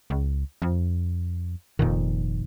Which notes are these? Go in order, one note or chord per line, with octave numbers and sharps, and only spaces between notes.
C#2
F2
F1 F2 A#2 D#3